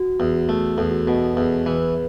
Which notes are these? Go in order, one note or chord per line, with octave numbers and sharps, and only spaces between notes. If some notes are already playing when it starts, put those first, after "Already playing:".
Already playing: F#4
E2
F#4
A3
E2 A4
F#4
B2 A4
E2
E3 B4